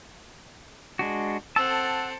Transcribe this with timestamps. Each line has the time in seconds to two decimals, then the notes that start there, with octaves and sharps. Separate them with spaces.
0.99 G#3 D4 F#4
1.56 C4 A4 F#5 A5 E6